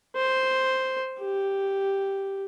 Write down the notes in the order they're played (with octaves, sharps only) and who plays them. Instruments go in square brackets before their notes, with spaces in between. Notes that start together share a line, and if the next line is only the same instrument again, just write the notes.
[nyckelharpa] C5
G4